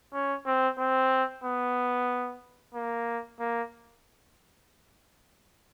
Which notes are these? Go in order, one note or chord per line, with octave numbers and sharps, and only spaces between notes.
C#4
C4
C4
B3
A#3
A#3